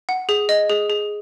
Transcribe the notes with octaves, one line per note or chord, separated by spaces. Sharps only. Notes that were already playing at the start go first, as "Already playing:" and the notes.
F#5
G#4
D#5
G#4
G#4